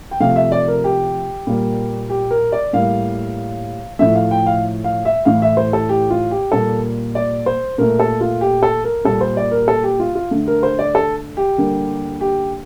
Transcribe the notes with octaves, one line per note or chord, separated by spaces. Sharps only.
G5
C3 F3 A3 F5
E5
D5
A#4
G4
A#2 G3 A#3
G4
A#4
D5
A2 G3 A#3 F5
A2 F3 A3 E5
F5
G5
F5
F5
E5
A2 E3 A3 F5
E5
C5
A4
G4
F4
G4
A#2 G3 A#3 A4
D5
C5
A#2 A3 A#4
A4
F4
G4
A4
A#4
A#2 G3 A#3 A4
C5
D5
A#4
A4
G4
F4
F4
D3 A3
A#4
C5
D5
A4
G4
D3 G3 A#3
G4